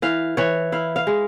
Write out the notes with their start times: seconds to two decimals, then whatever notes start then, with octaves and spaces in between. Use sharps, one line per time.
0.02 E3 F5
0.37 E3 C#5
0.72 E4 F5
0.96 F5
1.07 G#3